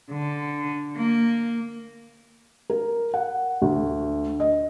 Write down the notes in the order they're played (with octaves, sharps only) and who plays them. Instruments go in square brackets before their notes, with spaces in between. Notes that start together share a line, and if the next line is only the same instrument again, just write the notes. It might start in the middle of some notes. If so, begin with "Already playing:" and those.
[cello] D3
A#3
[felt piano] A#4
F#5
D2
D#5